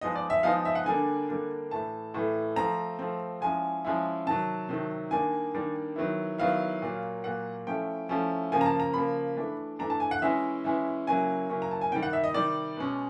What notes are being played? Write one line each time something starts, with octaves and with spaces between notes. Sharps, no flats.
F3 G#3 B3 D#4 D#5
D5
E5
F3 G#3 B3 D#4 F5
E5
F#5
D3 G3 A#3 D4 G#5
D3 G3 A#3 D4
A2 E3 A3 A5
A2 E3 A3
F3 A3 C4 A#5
F3 A3 C4
F3 G#3 C#4 E4 G#5
F3 G#3 C#4 E4
C3 D#3 F#3 A5
C3 D#3 F#3
D#3 G3 A#3 D4 G#5
D#3 G3 A#3 D4
D#3 F#3 B3 E4
D#3 F#3 B3 E4 F5
A#2 F#3 A#3
A#2 F#3 A#3 F#5
F3 A3 C#4 E4 G5
F3 A3 C#4 E4
C#3 F3 A#3 G#5
A#5
A5
A#5
C#3 F3 A#3 B5
E3 A3 D4
E3 A3 D4 A#5
A5
G#5
F#5
E3 G#3 C#4 E4 E5
E3 G#3 C#4 E4
C#3 F#3 A#3 C#4 E4 G#5
C#3 F#3 A#3 C#4 E4
A#5
A5
G#5
C3 D#3 G3 G5
F#5
E5
D#5
C3 D#3 G3 D5
B2 G#3 C#4